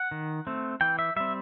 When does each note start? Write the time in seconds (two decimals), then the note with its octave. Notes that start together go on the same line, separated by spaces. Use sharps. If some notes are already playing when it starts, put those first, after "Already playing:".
Already playing: F#5
0.11 D#3
0.47 A3 C4
0.81 E3 G5
0.99 E5
1.16 G3 C4 E5